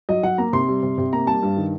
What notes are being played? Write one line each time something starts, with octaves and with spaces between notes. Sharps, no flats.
F#3 D#5
F#3 F#5
A#3 A#5
C3 C6
G3
C3
C3
A#3 A#5
G3 A5
G2
D#3